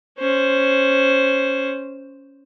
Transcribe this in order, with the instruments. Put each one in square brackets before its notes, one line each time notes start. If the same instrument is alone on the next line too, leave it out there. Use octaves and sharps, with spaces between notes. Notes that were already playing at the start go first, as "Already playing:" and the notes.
[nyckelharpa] C#4 C5